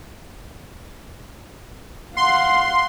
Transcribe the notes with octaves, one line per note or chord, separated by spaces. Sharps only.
F5 F#5 C6